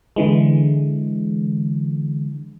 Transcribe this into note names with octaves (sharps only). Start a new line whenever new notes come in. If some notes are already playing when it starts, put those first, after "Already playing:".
D3 E3 G#3